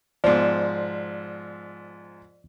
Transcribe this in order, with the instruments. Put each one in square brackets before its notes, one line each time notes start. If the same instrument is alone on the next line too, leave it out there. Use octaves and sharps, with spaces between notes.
[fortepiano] G#2 B2 F3 [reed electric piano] D5